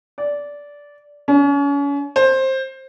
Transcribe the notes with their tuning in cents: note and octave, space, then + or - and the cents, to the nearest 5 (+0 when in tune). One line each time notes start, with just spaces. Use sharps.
D5 -15
C#4 +35
C5 +15